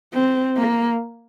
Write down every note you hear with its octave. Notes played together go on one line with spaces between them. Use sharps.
C4
A#3